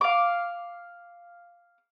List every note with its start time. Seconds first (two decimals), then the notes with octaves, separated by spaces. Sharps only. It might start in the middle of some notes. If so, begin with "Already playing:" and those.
0.01 F5 D6